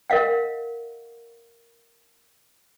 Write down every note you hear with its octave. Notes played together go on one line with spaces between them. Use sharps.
A#4 D#5 F5 F#5